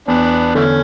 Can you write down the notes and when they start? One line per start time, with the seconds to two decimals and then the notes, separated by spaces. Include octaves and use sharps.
0.08 E2 B3 D4
0.55 D3 E3 A3 C#4